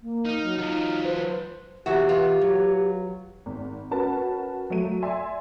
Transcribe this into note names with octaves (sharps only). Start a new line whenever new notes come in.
A#3
D#4 F6
F#3
F#3 D#4 F4
B4 C5
E2 E3 F#3 F#4 G4 E5
B3 F4
F#3
G#1
C#4 F#4 A#4 B4 A5
F#3 A3 D#7
D5 E5 G#5 C6